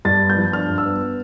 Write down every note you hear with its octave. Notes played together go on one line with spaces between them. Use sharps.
G2 A6
B3
G6
F3
D4 F6
G2
E6
B3